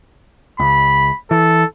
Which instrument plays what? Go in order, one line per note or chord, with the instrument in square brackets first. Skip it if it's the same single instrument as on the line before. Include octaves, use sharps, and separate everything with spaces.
[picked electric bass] C#2 [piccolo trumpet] B5
[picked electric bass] E3 [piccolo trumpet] A4